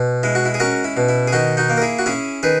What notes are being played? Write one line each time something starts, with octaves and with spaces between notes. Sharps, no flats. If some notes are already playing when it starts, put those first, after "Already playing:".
Already playing: B2
G#3 E4
F#4
E4
G#4
C#4 F#4 A#4
E4
B2
E4
G#4
D#3 D#4 F#4
D#4 F#4
A#3
A#4
E4 G#4
F#4
C#4 E4 G#4
D#3 G#4 B4